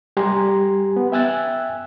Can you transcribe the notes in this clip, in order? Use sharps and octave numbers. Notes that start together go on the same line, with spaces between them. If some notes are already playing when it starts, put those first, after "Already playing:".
G3 G4 G#5 A#5 C6
B3
E5 G5 G#5 E6 F#6 A6